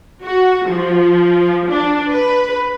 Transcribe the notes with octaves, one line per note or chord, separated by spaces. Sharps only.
F#4
F3
D4
B4